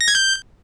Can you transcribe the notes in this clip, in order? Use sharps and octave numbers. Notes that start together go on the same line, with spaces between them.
A#6
G#6
G6